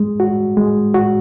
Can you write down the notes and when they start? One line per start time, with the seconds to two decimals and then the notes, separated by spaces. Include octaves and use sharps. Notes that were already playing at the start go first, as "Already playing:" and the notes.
Already playing: G#3
0.20 F#4
0.57 G#3
0.94 F#4